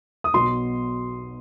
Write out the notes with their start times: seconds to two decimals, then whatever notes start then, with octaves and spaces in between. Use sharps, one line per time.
0.24 D#6
0.33 B1 B2 F#3 C6